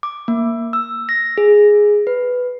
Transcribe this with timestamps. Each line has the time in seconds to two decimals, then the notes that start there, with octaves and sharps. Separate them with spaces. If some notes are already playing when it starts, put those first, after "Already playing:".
0.03 D6
0.28 A#3
0.73 E6
1.09 A#6
1.38 G#4
2.07 B4